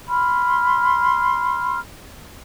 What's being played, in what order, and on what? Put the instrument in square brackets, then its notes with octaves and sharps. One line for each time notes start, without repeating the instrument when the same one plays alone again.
[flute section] B5 C6 F6